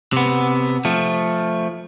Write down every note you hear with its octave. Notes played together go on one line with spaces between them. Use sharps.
C3 B3
F3 A3